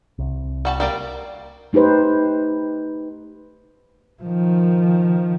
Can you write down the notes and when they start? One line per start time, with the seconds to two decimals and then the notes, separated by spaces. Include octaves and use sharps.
0.18 C2
0.65 G3 F#4 A5
0.80 G3 A#3 D5
1.73 A3 D#4 G4 B4 C5
4.23 D#3 F3